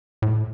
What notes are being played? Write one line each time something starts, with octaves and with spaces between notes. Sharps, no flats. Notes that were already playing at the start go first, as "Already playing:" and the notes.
A2